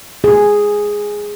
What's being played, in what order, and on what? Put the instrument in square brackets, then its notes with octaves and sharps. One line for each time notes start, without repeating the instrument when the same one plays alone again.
[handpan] G#4